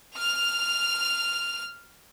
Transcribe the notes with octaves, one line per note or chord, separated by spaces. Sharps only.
F6 F7